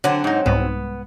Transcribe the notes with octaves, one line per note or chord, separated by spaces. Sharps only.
D3 F#3 C4
G#2 D#4
C2 G#2 B3